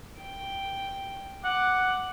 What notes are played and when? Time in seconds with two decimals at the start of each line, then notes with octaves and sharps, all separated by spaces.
0.21 G5
1.44 F#5 D6